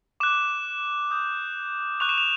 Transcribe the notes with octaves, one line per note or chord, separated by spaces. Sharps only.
D6 F#6 E7
D#6 G6
C#6 F#6 F7
E7
F7